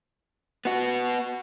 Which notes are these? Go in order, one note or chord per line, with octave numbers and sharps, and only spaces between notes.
B3 F#4